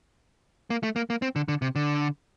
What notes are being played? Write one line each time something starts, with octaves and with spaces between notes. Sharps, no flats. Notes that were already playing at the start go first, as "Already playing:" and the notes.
A#3
A3
A#3
A#3
C4
D3
D3
C3
D3